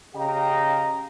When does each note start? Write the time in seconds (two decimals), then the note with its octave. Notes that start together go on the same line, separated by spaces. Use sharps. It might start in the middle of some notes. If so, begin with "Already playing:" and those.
0.15 C#3 G4 D#5 F5 G5 A#5